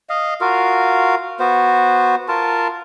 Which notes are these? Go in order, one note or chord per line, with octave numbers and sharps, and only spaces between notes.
D#5 F5
F4 F#4 A#4 F5
B3 F#4 C5
F4 A#4 A5